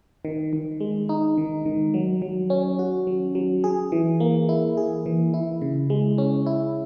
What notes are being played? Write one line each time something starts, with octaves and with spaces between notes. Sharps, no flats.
D#3
D#3
G#3
D#4
D#3
D#3
F#3
F#3
C#4
F#4
F#3
F#3
G#4
E3
A#3
E4
G#4
E3
E4
C#3
G#3
C#4
E4